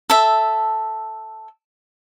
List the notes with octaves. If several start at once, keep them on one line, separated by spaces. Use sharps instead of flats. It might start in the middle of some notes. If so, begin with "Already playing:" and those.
A4 E5